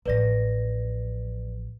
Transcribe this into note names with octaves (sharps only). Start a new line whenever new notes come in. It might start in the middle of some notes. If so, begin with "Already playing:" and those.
A1 F3 B4 D5 A#6